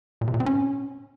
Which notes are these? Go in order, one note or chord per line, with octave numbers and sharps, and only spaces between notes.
A#2
C3
A#2
C4
C#4